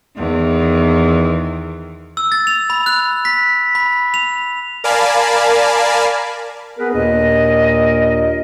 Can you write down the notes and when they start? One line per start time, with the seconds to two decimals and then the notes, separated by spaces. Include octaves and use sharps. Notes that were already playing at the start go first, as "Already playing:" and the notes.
0.17 E2 D#3
2.17 E6
2.32 A6
2.47 F7
2.70 B5
2.86 F#6
3.25 B6
3.75 B5
4.14 F7
4.84 A#4 D5 F5 G#5 A5 B5
6.77 B3 G#4 A#4 B4
6.94 D#2 A#2 D4 A#4 D#5